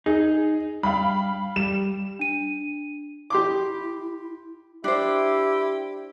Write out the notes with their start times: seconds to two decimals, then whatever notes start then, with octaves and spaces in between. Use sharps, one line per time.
0.06 D#4 G#4
0.83 G2 F5 G5 B5
1.56 G3 E7
2.19 D4 D#7
3.30 E4 G4 C6 D6
4.84 D4 E4 G4 C5